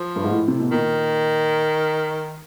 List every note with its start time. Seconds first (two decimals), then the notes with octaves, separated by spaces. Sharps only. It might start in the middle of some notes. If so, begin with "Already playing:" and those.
Already playing: F3
0.16 G2
0.23 G#2
0.31 A2
0.48 C3
0.60 B2
0.71 A#2 D#3